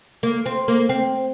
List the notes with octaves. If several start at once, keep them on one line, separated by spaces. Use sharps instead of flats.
A#3
C4
A#3
C4